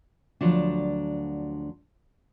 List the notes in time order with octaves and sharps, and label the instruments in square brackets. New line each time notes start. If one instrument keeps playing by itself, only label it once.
[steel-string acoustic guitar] D2 F3 F#3 D4